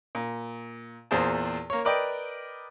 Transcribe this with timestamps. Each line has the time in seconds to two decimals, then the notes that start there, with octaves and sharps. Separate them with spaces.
0.15 A#2
1.11 E2 A#2 G#4 C5 A5
1.70 A#3 C#5
1.85 A#4 B4 D5 D#5 G5